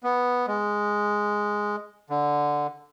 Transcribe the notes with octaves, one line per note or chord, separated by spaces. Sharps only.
B3
G#3
D3